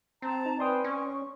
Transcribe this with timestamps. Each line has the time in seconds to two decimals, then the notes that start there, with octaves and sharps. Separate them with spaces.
0.22 C4 A5 A#5
0.46 D#4
0.59 B4 D5 G5 G#5 C6 D#6
0.84 C#4 C#6